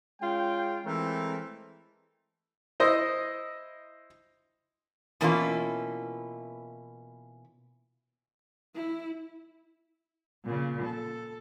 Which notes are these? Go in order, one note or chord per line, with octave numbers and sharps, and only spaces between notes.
G#3 C#4 F4 G5
E3 G#3 A3 C4 A#4
E4 C5 D#5
B2 E3 A#3 C#4 E4 F4
E4
A#2 C#3
A4